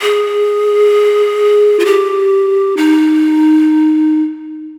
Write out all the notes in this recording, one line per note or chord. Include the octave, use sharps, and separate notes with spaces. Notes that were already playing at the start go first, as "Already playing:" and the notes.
G#4
F4
G4
D#4